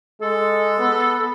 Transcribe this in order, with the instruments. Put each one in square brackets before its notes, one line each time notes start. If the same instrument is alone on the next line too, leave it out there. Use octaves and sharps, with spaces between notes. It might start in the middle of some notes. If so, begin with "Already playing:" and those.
[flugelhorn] G#3 [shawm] A4
[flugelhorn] B3